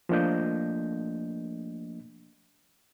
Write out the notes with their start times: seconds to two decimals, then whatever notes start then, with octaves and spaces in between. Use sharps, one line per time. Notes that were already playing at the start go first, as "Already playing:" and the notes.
0.09 F3 A3 A#3 D4 D#5 G6